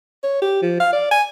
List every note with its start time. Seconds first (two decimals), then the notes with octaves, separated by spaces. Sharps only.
0.23 C#5
0.41 G4
0.62 F3
0.80 F5
0.93 D5
1.11 G#5